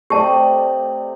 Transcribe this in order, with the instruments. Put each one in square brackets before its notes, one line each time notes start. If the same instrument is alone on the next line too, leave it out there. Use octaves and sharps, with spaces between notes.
[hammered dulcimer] C3 [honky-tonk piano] A3 D5 D#5 [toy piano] G4 A5